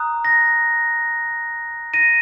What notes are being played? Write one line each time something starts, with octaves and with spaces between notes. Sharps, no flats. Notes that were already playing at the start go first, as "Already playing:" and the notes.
Already playing: A#5 D#6 F#6
A#6
A#6 D#7